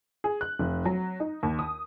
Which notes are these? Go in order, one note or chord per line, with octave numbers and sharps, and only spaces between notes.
G#4
F#6
F1
F#3
D#4
D#2
D#6